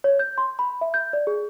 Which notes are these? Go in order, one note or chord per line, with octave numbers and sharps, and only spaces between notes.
C#5
G6
C6
B5
E5
G6
D5
G#4